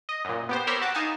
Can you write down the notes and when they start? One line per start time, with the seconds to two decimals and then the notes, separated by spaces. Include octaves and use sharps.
0.09 D#5
0.25 F#2 A#2
0.49 B3 G4 C5
0.67 G4 A#4 C5 C#5 B5 E6
0.81 F#4 A5 D6
0.94 D#4 F5 G#5 A5